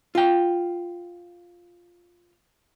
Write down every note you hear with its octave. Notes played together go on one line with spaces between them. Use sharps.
F4 G5